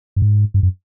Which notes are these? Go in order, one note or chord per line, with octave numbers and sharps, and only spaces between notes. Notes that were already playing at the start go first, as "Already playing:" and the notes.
G2
G#2
G2
F#2